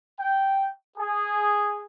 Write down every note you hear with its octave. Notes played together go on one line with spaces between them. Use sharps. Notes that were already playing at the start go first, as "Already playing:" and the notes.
G5
G#4